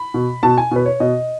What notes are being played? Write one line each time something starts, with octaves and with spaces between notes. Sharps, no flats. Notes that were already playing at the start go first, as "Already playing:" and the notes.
Already playing: B5
B2
B2 A5
G#5
B2 B4
C#5
B2 D#5